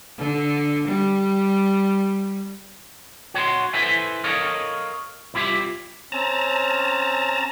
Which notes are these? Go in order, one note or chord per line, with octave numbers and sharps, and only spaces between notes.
D3
G3
F#4 C#5 F#5 A#5 C6
E4 A4 B4 C5 E5 G#5
A4 A#4 C#5 D#5 F5
C2 E4 F4 G4 E5
C4 C#4 A5 A#5